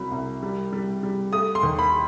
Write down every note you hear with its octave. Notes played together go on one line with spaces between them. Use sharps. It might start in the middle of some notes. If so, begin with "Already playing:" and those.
Already playing: C2 F#3 B5
C2
G3
G3
G3
A3 D#6
C6
D#2
B5